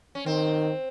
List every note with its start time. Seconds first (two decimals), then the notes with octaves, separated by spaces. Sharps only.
0.15 C#4
0.26 D#3 C4